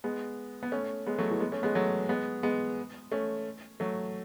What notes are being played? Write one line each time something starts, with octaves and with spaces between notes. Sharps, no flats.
G#3 B3
B3
A3 C#4
G#3 B3
F#3 A3
E3 G#3
G#3 B3
A3 C#4
G#3 B3
F#3 A3
G#3 B3
G#3 B3
A3 C#4
F#3 A3